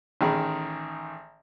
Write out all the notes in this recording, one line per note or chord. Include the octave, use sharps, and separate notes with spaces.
A1 D#3 G#4 B5